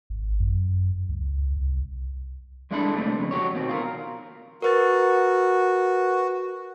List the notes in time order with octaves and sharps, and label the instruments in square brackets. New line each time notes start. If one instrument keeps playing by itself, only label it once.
[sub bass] G#1
F#2
C#2
C2
[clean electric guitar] C2 G#3 D4 E4 A4 B5
G#2 C3 G3 A3 A#3 C4
F2 C#3
F#4 G4 C#5
B2 D#3 C4
F4 G#4 A#4
[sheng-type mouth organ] F#4 [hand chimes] A#4 B4 A6